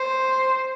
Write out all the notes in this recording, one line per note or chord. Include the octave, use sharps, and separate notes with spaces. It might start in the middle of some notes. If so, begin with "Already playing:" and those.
Already playing: C5